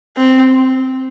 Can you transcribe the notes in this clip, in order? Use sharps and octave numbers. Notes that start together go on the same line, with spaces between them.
C4